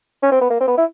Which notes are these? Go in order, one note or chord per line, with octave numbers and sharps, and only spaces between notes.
C#4
C4
B3
A#3
C4
B3
E4